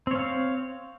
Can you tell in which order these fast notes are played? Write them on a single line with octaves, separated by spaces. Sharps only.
C4 C#5 F5